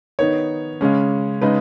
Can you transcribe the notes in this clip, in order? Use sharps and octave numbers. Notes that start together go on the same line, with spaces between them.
D#3 B3 D#4 C#5
C#3 G#3 C#4
C#3 G#3 D#4 B4